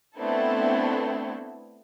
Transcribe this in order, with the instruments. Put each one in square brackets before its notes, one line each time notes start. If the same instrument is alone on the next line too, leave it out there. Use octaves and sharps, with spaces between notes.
[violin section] A3 B3 C4 D4 E4 A4